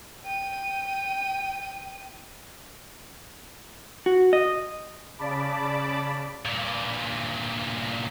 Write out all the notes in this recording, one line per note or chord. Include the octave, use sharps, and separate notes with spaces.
G5 D#7
F#4
D#5
C#3 D5 A5 B5 D6
G2 A#2